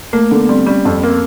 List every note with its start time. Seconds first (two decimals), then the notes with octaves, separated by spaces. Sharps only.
0.13 A3 A#3
0.31 D3 B3
0.49 G3 C4
0.66 G3 C#4
0.85 F2
1.03 A#3 C4